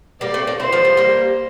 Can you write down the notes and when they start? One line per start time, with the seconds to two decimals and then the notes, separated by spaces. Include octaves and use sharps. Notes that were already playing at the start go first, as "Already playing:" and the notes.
0.21 G3 A#3 D5
0.34 A3 C4
0.47 A#3 D4
0.59 C4 E4 C5
0.72 F3 A3
0.85 G3
0.97 G3 A#3